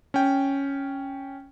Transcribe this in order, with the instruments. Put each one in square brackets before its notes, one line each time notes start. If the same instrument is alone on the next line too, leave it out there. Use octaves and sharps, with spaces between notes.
[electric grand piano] C#4 G5